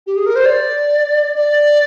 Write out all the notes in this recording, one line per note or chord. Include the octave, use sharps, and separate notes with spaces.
G4
G#4
A#4
C5
D5
D5